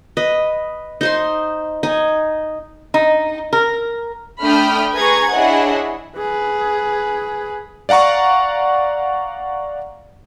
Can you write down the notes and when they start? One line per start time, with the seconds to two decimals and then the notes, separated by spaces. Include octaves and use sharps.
0.17 B4 D#5
1.01 D#4 C5 C6
1.83 D#4 G#5
2.94 D#4
3.53 A#4
4.41 A3 D4 G5 B5 D#6 F6
4.96 G#4 B4 A#5 C#6 G#6
5.32 D4 E4 G#4 C#5 D#5 F#5
6.17 G#4 B4
7.89 D5 F5 F#5 A#5 C#6